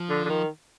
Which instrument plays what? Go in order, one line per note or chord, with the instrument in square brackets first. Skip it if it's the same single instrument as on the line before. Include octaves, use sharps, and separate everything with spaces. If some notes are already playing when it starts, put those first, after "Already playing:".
Already playing: [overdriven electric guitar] F3
[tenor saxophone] D3
D3
D#3